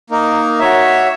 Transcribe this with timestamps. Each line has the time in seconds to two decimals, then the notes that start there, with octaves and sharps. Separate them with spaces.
0.10 A#3 D#4 A#4
0.59 F#4 C#5 E5